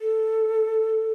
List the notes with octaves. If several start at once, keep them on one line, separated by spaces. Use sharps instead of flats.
A4